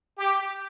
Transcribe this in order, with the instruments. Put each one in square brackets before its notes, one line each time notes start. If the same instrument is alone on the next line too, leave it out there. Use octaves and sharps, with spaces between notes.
[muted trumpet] G4